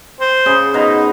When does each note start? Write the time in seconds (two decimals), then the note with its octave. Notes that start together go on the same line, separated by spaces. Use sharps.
0.21 C5
0.46 C#3 G#4
0.74 B2 D#4 A#5